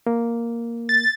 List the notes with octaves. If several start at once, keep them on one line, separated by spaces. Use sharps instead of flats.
A#3
A6